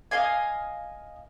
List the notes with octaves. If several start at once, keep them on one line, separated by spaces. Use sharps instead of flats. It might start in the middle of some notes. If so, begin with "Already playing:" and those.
D#5 F5 G#5